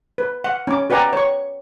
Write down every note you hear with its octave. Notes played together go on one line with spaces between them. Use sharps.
B4
F#5
C#4 D6
F#4 B4 D5 G5 G#5 A#5
C#5 C#6